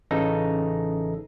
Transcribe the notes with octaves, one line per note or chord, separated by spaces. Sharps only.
A1 C#3 E3 D#4 A4 A#6